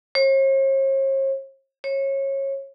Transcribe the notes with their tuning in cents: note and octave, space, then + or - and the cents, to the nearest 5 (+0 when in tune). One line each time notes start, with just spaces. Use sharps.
C#5 -45
C#5 -25